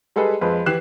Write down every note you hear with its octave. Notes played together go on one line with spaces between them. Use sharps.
G3 G#3 G#4 A4 B4
F2 G#3 B4
E3 G4 F#6 C7 E7